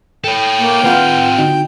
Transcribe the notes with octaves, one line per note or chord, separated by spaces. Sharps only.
A4 C#5 G5
A#3
C4 F4 G#4 B4 F#5 G6
D3 D#4 F#4